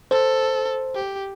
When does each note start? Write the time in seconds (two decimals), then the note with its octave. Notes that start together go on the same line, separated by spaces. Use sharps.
0.11 A4 C5
0.95 G4